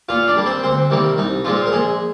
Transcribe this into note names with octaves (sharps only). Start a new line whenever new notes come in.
A#2 F4 F5
D4 D5
G3 A#3
C4 C5
D2 C4 C5
C3 D#3 G3 A#3
C2 D#4
A#2 F3 G#3 C4 F4
A#4
A#1 G#3 G#4